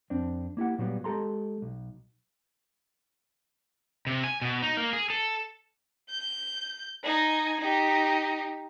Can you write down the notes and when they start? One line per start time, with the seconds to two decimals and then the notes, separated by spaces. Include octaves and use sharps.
0.10 F2 C4 D4
0.57 A#3 E4 G4 F#5
0.78 A#2 F#3 G3 B3
1.04 G#3 G4 A4 A#5 C6
1.62 B1
4.07 C3
4.24 G#5
4.42 B2
4.63 D#4
4.77 A#3
4.93 G#4
5.10 A4
6.10 G6
7.04 D#4 G#5
7.60 D#4 G4